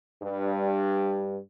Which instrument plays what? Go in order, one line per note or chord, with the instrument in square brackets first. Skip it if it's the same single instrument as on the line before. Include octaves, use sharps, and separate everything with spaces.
[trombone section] G2